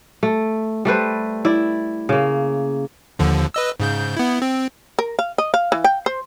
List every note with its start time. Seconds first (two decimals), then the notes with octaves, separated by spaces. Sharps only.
0.23 A3
0.85 G3 A3 B4 C5
1.45 E4 D5 E5
2.09 C#3 A#3
3.19 D#2 D3 F3
3.54 B4 D#5 E6
3.80 G#2 C#3 G6
4.17 B3 E4
4.42 C4
4.99 A#4
5.19 F5
5.38 D#5
5.54 F5
5.72 E3
5.84 G5
6.06 C5